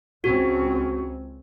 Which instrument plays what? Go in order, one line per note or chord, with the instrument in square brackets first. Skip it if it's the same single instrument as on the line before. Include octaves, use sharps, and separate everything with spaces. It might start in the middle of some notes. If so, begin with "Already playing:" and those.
[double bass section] C#2 C4 C#4 [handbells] F#4